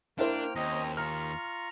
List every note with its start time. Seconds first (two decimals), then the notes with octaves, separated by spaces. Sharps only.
0.19 A#3 D4 E4 A#4 C5 G5 F6
0.55 D#2 C4 C#4 D#5 A#5
0.97 F4 A#5 C#6 F6